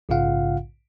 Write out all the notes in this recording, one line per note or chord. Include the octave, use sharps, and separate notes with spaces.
A#1 G#2 C#3 F4 F5 F#5